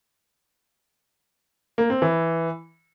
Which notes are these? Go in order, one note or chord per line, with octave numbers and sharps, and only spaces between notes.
A#3
C4
E3